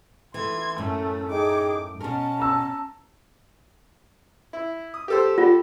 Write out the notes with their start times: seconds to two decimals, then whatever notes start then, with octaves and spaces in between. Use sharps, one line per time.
0.34 E3 A3 C6 G#6
0.78 F#2 A2 A3 C#4
1.29 D#4 G#4 G5 D6
2.01 B2 C#4 A#4 A5
2.39 A#5 E6
4.53 E4
4.94 D#6
5.08 G4 A4 C5
5.38 F4